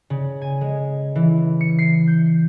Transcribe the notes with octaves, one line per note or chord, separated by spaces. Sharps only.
C#3
G#5
G#3
E3
C#7
C7
G6